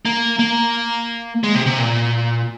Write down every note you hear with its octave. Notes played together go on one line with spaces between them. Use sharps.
A#3
A#3
G#3
C3
C3
A#2